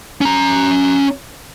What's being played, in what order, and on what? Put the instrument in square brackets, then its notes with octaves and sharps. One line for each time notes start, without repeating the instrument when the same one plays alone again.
[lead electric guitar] C#4 A#5